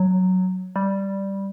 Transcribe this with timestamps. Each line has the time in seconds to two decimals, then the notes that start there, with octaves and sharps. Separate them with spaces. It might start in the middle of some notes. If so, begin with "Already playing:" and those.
Already playing: F#3
0.76 G3